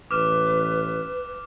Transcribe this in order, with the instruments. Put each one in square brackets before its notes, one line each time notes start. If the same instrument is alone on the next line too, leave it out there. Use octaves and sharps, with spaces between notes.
[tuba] A1 [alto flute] B4 [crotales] D6 F6 E7